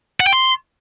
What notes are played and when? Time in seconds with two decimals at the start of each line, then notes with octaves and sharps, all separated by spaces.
0.20 F#5
0.26 G5
0.33 C6